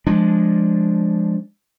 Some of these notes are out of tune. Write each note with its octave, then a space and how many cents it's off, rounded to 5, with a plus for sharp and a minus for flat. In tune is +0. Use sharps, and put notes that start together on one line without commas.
F3 +0 G#3 +0 D4 +0